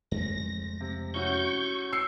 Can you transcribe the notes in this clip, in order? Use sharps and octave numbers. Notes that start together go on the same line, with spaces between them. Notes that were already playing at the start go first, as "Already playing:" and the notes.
F2 G#3 A3 A#6
C3
C#4 E4 F#4 C#6 G6
E6 C7 C#7